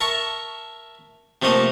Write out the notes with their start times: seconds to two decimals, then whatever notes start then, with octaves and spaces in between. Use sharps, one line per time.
0.01 A#4 E5 A5 C#6
1.42 C3 F3 A3 A#3 D#5